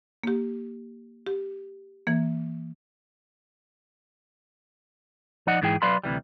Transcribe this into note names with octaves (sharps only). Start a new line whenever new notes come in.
A#3 G4
G4
E3 A#3
F3 D#4 D5 D#5 F#5
G#2 E3 E4 G#4 G5
F#3 B4 D5 F5 B5 C6
D2 C3 E3 G3